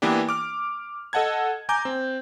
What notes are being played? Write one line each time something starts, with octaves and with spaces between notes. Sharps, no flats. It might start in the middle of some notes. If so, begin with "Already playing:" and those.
E3 A#3 B3 D4 G4
D6 F6
A4 D#5 F#5 A5 G#6
G#5 A#5 D6 G6
C4